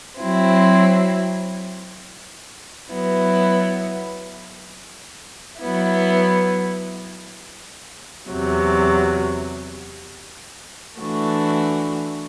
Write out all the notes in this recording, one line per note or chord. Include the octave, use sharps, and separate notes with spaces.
F#3 C4 E4
F#3 B3 E4
F#3 B3 E4
E2 C3 F#3
E3 A3 D4 F#4